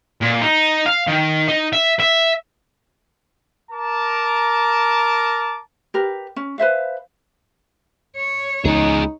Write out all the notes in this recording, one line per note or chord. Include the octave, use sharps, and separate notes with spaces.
A#2
D#4
F5
D#3
D#4
E5
E5
A#4 A5 A#5 D6
G4 A#4 B4
C#4
B4 C5 E5 F5
C#5
C#2 B3 D#4 G#4